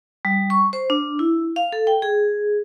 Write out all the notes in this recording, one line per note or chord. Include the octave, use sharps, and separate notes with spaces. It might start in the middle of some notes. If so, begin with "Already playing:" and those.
G3
C#6
C5
D4
E4
F5
A4
G5
G#4